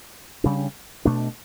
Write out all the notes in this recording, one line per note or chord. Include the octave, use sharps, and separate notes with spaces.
C#3 G3 D4
B2 A3 D4